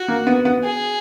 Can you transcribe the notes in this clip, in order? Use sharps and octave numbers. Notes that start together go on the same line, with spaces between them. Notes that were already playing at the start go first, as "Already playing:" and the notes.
Already playing: F#4
A#3
B3
B3
G#4